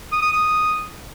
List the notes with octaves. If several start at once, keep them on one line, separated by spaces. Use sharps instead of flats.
D#6
D#6
D#6